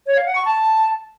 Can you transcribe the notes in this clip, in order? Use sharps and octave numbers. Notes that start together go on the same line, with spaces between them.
C#5
F5
F#5
C#6
A5